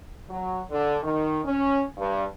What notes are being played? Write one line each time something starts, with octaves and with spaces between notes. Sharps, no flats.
F#3
D3
D#3
C#4
G2